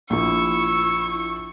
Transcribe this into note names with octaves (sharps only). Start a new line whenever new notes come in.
A#1 F3 E4 C#6 E6